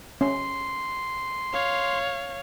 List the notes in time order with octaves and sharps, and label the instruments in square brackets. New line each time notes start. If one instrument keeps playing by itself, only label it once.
[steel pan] C#4 [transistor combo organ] C6
[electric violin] C#5 F5